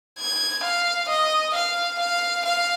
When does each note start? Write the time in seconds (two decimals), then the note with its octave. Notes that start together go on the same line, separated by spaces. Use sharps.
0.18 G#6
0.63 F5
1.09 D#5
1.54 F5
1.99 F5
2.45 F5